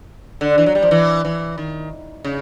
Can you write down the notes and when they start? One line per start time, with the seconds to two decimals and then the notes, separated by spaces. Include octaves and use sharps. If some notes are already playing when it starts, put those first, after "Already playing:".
0.41 D3
0.58 E3
0.66 F#3
0.75 G3
0.83 F3
0.91 E3
1.25 E3
1.58 D#3
2.24 C#3